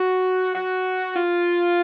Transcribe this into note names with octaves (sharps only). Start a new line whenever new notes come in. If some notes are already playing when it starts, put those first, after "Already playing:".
Already playing: F#4
F#4
F4